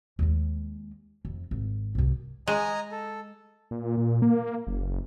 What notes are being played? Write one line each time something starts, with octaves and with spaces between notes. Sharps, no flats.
D#2 G#3
F2
G#1
C2 F#2
G#3 D#5 G#5 A#5
A4
A#2
A#2
A#3
F#1